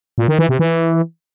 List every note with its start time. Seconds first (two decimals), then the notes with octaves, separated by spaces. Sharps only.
0.18 A#2
0.28 D#3
0.39 E3
0.49 C3
0.59 E3